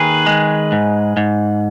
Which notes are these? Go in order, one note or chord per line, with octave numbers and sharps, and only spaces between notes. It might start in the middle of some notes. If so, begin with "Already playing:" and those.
Already playing: D#2 D#3 G#4 B4
G#3
G#2
G#2